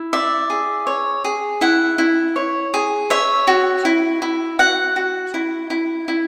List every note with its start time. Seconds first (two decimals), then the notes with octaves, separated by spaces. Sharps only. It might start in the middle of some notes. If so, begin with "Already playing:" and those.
Already playing: E4
0.13 D5 E5
0.50 G#4
0.87 C#5
1.24 G#4
1.61 E4 F#5
1.98 E4
2.36 C#5
2.74 G#4
3.10 C#5 E5
3.47 F#4
3.85 E4
4.22 E4
4.59 F#4 F#5
4.96 F#4
5.34 E4
5.70 E4
6.08 E4